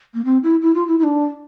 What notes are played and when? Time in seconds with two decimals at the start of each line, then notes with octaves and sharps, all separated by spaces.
0.14 A#3
0.24 C4
0.43 E4
0.61 E4
0.74 F4
0.87 E4
0.98 E4
1.03 D4